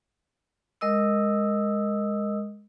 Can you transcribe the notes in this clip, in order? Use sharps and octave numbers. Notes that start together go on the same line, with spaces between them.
G#3 A#4 D#5 D#6 E6